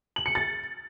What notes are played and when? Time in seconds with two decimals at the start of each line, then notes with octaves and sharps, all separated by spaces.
0.16 F#7
0.26 C#7
0.35 A6